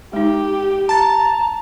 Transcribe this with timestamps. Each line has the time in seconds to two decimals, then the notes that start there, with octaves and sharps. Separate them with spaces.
0.13 G#3 D#4 G4
0.89 A5 A#5 A6